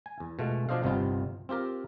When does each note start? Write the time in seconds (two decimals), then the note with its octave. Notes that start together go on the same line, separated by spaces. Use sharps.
0.06 G#5
0.20 E2
0.39 B2 G#3 A3 F4
0.69 B2 F3 D4 C5 D#5 F5
0.83 G1 C2 C3 B3 D#4 F4
1.49 C4 F4 G4 A#4